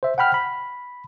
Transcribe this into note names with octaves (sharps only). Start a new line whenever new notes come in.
C5 E5
F#5 G5 B5 F6
B5